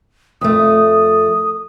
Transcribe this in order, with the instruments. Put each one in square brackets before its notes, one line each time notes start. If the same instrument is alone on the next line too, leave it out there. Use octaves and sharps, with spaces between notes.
[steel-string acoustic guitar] F2 A3 [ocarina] D#6